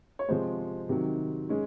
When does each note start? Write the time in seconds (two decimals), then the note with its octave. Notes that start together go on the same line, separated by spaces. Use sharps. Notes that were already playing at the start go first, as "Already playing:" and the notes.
0.19 C#5
0.29 C3 F3 G#3 C5
0.89 C3 D#3 F#3
1.49 G#3 C#4